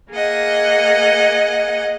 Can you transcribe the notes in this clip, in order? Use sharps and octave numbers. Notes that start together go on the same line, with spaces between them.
A#3 G#4 D#5 F#5